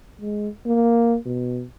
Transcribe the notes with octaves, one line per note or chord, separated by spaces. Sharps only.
G#3
A#3
B2